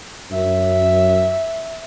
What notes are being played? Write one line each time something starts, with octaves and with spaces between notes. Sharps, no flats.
F#2 E5